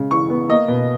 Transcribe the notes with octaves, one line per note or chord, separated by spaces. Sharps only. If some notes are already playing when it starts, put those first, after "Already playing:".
Already playing: C#3 G#3
E3 C#6
B3
A#3 D#5
B2